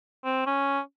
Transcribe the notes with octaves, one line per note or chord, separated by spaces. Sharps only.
C4
C#4